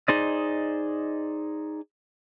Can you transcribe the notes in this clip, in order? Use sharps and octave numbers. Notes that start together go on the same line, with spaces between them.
D#4 G#4 C5 D5 D#5